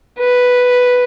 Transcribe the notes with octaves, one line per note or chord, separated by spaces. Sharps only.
B4